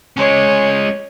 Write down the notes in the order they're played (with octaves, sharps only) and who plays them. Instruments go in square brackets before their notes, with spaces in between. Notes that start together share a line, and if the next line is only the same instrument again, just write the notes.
[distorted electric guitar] G#3 C#4 [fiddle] C#5